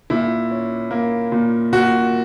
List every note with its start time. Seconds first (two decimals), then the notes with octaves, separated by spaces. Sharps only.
0.10 A#2 E4
0.51 C#4
0.91 A#3
1.32 A#2
1.73 A#2 F#4